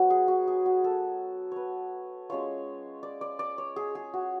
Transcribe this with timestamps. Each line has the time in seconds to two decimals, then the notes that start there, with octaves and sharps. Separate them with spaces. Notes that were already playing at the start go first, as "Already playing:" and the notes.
Already playing: F#3 B3 F#4
0.10 G#4
0.28 F#4
0.48 G#4
0.66 F#4
0.84 A4
1.52 B4 C#5
2.29 G#3 C#4 F4 C#5
3.03 D5
3.21 D5
3.39 D5
3.58 C#5
3.76 G#4
3.95 G#4
4.14 F#4